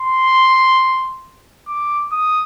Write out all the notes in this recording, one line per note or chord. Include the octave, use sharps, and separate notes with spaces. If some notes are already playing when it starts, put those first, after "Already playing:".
Already playing: C6
D6
D#6